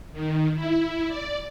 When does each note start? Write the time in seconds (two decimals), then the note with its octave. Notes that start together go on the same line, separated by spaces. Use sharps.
0.13 D#3
0.55 E4
1.08 D5